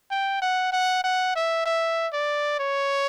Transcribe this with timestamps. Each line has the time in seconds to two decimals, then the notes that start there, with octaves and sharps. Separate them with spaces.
0.11 G5
0.42 F#5
0.72 F#5
1.04 F#5
1.36 E5
1.66 E5
2.13 D5
2.59 C#5